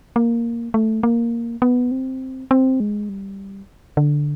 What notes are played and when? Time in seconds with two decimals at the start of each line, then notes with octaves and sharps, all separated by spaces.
0.16 A#3
0.74 A3
1.03 A#3
1.62 B3
1.91 C4
2.51 C4
2.80 G#3
3.09 G3
3.97 D3